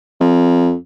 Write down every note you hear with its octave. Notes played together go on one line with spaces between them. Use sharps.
F2